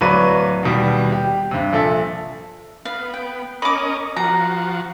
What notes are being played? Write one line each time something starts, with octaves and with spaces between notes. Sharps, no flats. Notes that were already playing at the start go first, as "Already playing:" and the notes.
D1 F#3 B4 D5 C#6 D#7
D#2 B2 G3
G4
G2 C3
A#1 A4 E5
B3 F5
G5
C#4 A#4 D#5 B5 D6
F3 F#4 A#5